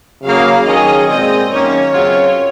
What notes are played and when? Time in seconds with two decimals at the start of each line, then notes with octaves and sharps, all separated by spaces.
0.24 C#3 F#3 A#3 F5
0.66 D#3 F#3 C#4 G#4 D#5
1.08 A#2 G#3 C4 D#5
1.50 F#2 D#3 A#3 C#4 C#5
1.93 F#2 C#3 F#3 C4 F4